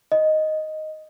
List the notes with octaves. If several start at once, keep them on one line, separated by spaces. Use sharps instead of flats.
D#5